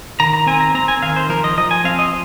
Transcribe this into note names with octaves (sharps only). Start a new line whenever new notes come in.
D#3 A#5
A#5
C4 G#5
A#5
C4 A#5
G#5
D#3 F5
C5
F3 A#4
D#5
F3 D#5
G#5
C4 F5
D#5